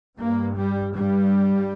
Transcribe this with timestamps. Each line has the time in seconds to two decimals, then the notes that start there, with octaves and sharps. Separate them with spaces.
0.17 G2 A#3
0.56 G3
0.93 G2 G3